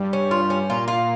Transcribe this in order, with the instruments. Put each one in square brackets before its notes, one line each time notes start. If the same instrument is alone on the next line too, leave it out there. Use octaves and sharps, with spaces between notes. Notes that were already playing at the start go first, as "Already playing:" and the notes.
Already playing: [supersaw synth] G2 G3
[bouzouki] C#4
F4
C#4
[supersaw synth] A#2 A#3 [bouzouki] F4
[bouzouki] F4